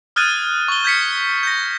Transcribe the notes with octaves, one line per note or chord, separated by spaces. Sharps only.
D#6 F6 F#6 G#6 A6 D#7
C#6 G7
G6 G#6 B6 C#7
G6 A#6